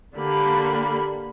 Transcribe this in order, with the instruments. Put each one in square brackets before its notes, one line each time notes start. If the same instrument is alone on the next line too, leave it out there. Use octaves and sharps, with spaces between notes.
[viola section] D3 A#3 G4 B5